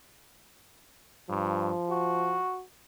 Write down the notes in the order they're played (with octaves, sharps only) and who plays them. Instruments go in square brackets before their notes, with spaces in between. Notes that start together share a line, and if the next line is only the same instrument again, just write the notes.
[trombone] G2 [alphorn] F3
[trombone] F#4